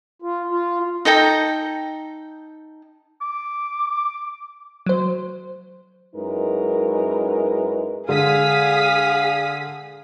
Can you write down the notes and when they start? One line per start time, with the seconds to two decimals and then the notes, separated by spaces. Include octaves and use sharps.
0.22 F4
0.51 F4
1.05 D#4 A4 G5 A#5
3.21 D6
4.86 F#3 C5
6.15 F#2 G#3 D#4 E4 A#4 B4
8.09 D3 G#3 G#4 F5 D#6 B6